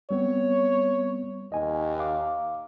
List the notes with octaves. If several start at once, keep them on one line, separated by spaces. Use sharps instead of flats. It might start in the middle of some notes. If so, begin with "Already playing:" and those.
G3 B3 C4 C#5
D#2 D#5 G#5
F5 D6